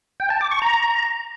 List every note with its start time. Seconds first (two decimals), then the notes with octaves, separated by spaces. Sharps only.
0.20 G5
0.30 A5
0.41 D6
0.51 C#6
0.62 A#5